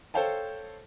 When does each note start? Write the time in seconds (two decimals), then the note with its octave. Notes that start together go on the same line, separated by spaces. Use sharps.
0.14 A4 C5 C#5 F5 G5 A5